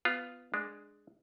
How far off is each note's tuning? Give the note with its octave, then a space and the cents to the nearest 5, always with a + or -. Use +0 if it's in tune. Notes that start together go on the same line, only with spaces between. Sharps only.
B3 +15 F4 +0
G#3 +0 D4 +15